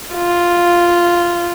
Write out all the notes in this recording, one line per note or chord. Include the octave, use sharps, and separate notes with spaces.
F4